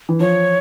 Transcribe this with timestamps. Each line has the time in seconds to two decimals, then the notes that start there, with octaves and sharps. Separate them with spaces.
0.09 E3
0.20 F3 C#5